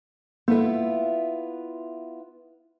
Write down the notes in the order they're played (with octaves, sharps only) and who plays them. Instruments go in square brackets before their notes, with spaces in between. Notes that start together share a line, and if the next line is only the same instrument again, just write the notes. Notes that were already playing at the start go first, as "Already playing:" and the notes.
[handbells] A#3 A4 [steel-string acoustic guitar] B3 E4 F4